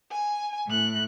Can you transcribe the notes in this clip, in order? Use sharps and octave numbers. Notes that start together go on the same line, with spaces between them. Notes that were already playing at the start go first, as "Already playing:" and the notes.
G#5
A2 F#6